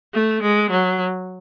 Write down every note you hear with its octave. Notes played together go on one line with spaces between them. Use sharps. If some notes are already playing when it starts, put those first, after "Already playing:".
A3
G#3
F#3